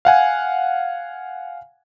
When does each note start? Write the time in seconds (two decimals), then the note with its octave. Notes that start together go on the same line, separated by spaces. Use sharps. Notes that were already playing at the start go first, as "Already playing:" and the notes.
0.05 F5 F#5 G#5